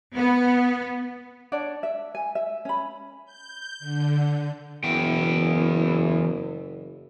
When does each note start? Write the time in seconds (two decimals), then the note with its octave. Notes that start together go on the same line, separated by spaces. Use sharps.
0.16 B3
1.52 D4 C#5 D5 F#5
1.83 E5
2.15 G#5
2.35 E5
2.65 C#4 B5
3.25 G6
3.80 D3
4.84 F#1 E3 B3 G5